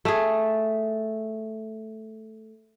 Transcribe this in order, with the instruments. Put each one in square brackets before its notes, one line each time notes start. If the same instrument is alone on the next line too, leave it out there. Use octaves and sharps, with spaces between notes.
[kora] A3 G#4